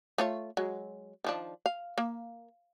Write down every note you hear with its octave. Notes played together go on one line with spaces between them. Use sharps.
A3 F4 C#5
F#3 G#3
D#3 F3 D4
F5
A#3